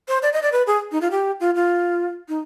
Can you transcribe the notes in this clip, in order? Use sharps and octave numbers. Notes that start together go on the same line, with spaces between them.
C5
D5
D#5
D5
B4
G#4
D#4
F4
G4
F4
F4
D#4